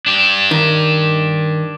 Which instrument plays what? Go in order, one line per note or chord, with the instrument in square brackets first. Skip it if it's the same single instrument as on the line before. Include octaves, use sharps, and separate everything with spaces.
[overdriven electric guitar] D4 G4
[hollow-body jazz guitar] D#3